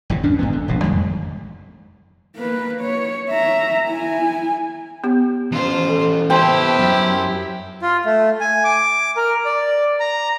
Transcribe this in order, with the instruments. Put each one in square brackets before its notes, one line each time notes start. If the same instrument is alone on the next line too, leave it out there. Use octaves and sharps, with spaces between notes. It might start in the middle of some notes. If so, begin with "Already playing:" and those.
[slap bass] G1 E2 C3
G#1 F#2 C#4 D4
G2 D3 B3
D3
E1 A#1 B2
F2 G#2 D#3 G3
[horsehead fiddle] A#3 B4
C#5
E5 A#5
E4 G#5
[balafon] B3 G4
[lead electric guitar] E3 C#4 [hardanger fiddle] F4 C5
[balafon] A4
[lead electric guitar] B3 A5 [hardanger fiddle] E4 G4 [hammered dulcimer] C5 G5
[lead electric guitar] F#2
[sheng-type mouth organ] F4
A3
G#5
D6
A#4
D5
A#5